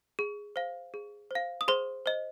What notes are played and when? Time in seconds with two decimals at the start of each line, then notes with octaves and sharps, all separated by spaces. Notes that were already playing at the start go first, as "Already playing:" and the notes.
0.19 G#4
0.56 C5 F5
0.94 G#4
1.31 C5 F5
1.61 D#6
1.68 G#4 C5 C6
2.06 C5 D#5